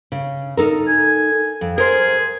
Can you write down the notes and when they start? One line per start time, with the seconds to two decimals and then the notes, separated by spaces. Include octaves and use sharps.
0.12 C#3
0.57 D#4 A4 A#4
0.88 G#5
1.61 F2
1.78 G#4 A#4 C5